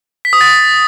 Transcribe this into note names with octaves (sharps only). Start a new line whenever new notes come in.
B6
D#6
A6